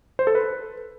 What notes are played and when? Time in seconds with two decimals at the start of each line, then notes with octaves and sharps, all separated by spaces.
0.19 C5
0.27 A4
0.35 B4